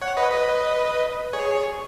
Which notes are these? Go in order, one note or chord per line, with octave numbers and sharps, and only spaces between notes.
C#5 F#5
B4 D#5
B4 D#5
G#4 C#5